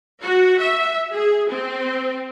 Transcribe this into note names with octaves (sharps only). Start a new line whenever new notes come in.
F#4
E5
G#4
C4